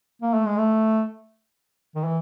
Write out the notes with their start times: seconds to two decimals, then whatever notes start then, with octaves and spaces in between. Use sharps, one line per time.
0.22 A#3
0.34 A3
0.46 G#3
0.58 A3
1.95 D#3
2.05 E3